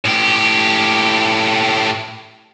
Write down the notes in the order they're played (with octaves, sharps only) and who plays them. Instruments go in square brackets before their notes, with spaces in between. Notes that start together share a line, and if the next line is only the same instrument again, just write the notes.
[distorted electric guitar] A2 G4